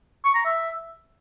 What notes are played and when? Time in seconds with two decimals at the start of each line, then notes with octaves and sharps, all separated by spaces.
0.25 C#6
0.35 A#5
0.45 E5